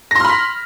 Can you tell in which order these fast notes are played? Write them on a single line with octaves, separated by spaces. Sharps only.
A#6 C6 F6 B5 B6